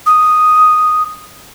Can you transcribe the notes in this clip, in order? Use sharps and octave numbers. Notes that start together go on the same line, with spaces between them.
D#6